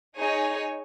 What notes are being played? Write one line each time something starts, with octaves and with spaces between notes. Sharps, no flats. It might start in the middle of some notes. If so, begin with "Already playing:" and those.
D#4 G#4 C#5 G#5